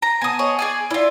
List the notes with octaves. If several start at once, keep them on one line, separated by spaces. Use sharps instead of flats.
A#5
B3 G#5 A5 D#6
G#4 C#5 D#5
G#4 D5 G#5
E4 F4 D5